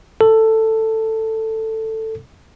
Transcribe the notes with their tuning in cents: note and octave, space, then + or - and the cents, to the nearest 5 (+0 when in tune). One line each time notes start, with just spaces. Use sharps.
A4 +10